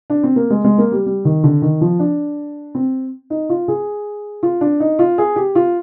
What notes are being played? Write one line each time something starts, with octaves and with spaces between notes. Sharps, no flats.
D4
C4
A#3
G#3
G#3
A#3
G3
G3
D#3
D3
D#3
F3
D4
C4
D#4
F4
G#4
F4
D4
D#4
F4
G#4
G4
F4